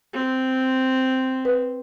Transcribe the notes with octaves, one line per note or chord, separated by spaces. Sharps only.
C4
B4